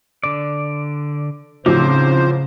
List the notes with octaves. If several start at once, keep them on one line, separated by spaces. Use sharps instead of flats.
D3 D5
A1 C#3 F3 C4 D#4 C5 D6